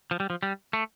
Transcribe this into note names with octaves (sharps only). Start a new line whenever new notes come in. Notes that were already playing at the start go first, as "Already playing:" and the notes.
F3
G3
F3
G3
A3